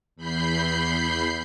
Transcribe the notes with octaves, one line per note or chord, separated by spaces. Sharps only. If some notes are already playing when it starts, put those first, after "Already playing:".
E2 B5 G6 C7